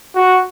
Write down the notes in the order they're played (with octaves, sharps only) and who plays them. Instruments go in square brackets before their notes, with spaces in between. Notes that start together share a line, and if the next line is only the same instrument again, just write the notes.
[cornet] F#4